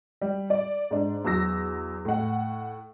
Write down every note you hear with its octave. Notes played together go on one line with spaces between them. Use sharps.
G3
D5
G#2 D4
E2 F#3 E6 A#6
A2 F#5